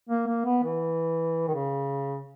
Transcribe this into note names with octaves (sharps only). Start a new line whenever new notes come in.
A#3
A#3
B3
E3
D#3
C#3